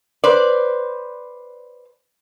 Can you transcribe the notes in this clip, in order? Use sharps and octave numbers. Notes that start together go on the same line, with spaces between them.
B4 C5 D5